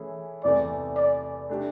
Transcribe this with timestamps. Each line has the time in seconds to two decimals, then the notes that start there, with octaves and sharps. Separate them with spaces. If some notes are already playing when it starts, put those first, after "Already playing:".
Already playing: E3 A3 C#4 E4 G#4
0.44 E2 C3 E3 A3 D5
0.96 D5
1.49 A3 D4 G4